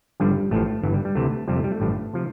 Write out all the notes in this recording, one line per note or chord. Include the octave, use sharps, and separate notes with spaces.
G1 G2 D3 F3 G3
A1 A2 F3 A3
G1 G2 E3
G3
G3
D2 C3 E3 A3
F2 C3 F3 G3
A3
G3
A3
A1 G2 D3 F3
C3 F3